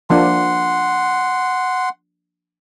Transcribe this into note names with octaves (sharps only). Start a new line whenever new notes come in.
F3 A#3 D4 F#5 C6